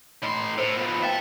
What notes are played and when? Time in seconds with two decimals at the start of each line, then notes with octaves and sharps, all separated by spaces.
0.23 A2 D#5 B5 C6
0.57 A2 A#4 C5
0.77 F3 B3 B5
1.03 E5 F5 G5 A5 A#5